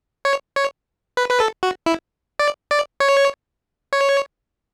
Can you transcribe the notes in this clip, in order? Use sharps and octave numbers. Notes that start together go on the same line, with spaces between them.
C#5
C#5
B4
B4
A4
F#4
E4
D5
D5
C#5
C#5